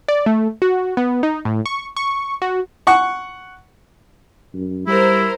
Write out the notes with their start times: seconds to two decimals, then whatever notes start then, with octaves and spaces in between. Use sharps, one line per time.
0.08 D5
0.26 A3
0.62 F#4
0.97 B3
1.23 D#4
1.45 A2
1.66 C#6
1.96 C#6
2.42 F#4
2.87 F#5 C#6
4.54 F#2
4.87 G3 E4 A#4 C5